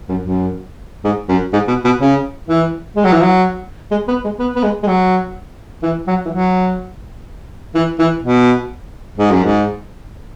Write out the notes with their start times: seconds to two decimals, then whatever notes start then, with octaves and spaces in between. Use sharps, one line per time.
0.09 F#2
0.23 F#2
1.04 G#2
1.29 F#2
1.53 G#2
1.68 B2
1.85 B2
2.00 C#3
2.47 E3
2.96 G#3
3.05 F#3
3.12 E3
3.22 F#3
3.91 G#3
4.08 B3
4.24 G#3
4.39 B3
4.56 B3
4.63 G#3
4.83 G#3
4.88 F#3
5.83 E3
6.07 F#3
6.26 E3
6.31 F#3
7.75 E3
7.99 E3
8.23 B2
9.18 G#2
9.31 F#2
9.44 G#2